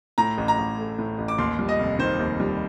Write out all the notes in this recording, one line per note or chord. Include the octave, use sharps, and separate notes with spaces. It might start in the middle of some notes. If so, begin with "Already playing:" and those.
A2 A#5
A1
A#5
A1
A3
A2
A1
D6
D#2 C6
G3
D#5
F1
D#3 C5
D#2
G3